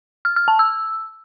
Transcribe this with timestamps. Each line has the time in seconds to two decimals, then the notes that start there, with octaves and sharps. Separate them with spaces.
0.25 F6
0.36 F6
0.48 A5
0.59 E6